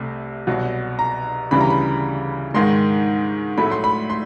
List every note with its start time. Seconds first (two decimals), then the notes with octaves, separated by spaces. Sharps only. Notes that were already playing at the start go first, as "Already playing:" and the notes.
Already playing: C2 C3 A3
0.47 C2 B2 F#3
0.99 A#5
1.51 D2 C#3 E3 G3 B5
1.61 A#5
1.70 B5
2.54 G#2 D#3 G#3 C6
3.58 A2 F#3 A3 B5
3.71 C6
3.84 B5
4.10 C6